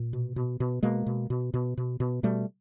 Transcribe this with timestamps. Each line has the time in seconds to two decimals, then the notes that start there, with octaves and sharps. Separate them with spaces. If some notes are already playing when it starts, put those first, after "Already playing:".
Already playing: A#2
0.13 B2
0.36 B2
0.60 B2
0.83 B2 G#3 A#3
1.06 B2
1.30 B2
1.54 B2
1.77 B2
2.00 B2
2.23 B2 G3 A3